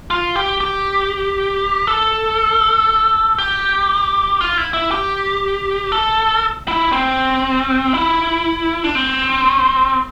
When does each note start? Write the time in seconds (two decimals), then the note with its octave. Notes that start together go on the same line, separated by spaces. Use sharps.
0.11 F4
0.36 G4
0.61 G4
1.87 A4
3.38 G4
4.41 F4
4.57 E4
4.73 E4
4.91 G4
5.92 A4
6.68 E4
6.92 C4
7.94 E4
8.84 D4
8.95 C4